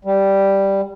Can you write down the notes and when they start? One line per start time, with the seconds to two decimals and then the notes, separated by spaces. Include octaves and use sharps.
0.05 G3